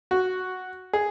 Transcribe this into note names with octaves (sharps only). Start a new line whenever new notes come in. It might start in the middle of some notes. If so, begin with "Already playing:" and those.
F#4
G#4